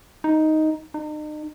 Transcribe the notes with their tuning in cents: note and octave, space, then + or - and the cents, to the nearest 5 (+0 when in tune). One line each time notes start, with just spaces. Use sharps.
D#4 +5
D#4 -40